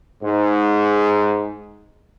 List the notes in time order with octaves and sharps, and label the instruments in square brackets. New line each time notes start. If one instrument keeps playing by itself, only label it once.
[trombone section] G#2